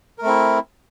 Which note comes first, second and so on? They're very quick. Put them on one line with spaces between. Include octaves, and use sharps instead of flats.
A#4 A3 C4 E4